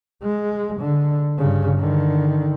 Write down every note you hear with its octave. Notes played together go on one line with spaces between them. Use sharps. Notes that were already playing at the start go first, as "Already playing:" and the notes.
G#3
D3
G2 C#3
D3 D#3